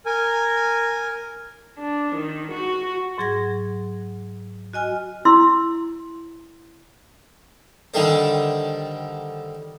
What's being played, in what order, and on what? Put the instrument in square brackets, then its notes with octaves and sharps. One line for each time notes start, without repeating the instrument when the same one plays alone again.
[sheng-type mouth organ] A#4 G#5
[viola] D4
D#3
F#4
[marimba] G#2 F#3 G#4 F#5 G#6 A#6
F#4 D#5 G#5 F6
[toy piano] E4 C6 E6
[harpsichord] D3 D#3 G3 A3 C5